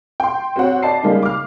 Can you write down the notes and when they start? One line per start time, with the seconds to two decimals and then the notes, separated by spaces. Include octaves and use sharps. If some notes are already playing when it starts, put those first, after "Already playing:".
0.20 G5 C6
0.56 C4 F#4 C#5 F#5
0.83 D5 D#5 A5 C7
1.03 C#3 G3 G#3 A#3 D#4
1.22 D6 F6